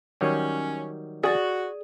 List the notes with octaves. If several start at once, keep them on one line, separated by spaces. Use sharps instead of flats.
D#3 F#3 G3 C#4
F#4 G#4 D5 A6